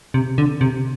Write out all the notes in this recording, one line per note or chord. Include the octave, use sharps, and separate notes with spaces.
C3
D3
C3